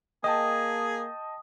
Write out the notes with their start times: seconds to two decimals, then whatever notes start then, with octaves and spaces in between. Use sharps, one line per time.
0.24 A#3 G#4 D#5 G5 A5 D#6